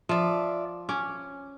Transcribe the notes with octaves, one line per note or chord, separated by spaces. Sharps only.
F3 D5 E5
C#4 D6